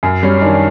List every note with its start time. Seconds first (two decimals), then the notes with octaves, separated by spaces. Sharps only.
0.03 F#2
0.23 G3 C#4
0.42 D#3 D4